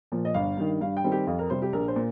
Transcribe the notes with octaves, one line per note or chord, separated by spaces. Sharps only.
A#2 F3
D#5
G1 F5
G2 D#3
G2 F5
G5
D#3 G3 C4
G4
F2 F4
A#4
C3 G3 C5
G4
A#1 A#4
C5
A#2